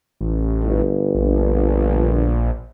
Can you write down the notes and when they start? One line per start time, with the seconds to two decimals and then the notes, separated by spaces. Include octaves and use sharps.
0.21 A1
0.63 G1
1.15 A#1